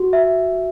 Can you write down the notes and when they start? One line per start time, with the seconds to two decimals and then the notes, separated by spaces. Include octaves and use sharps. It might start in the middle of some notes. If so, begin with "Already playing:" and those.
Already playing: F#4
0.13 E5